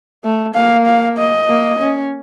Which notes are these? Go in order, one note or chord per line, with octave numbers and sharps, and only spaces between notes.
A3
A#3 F5
F5
D#5
A#3
C#4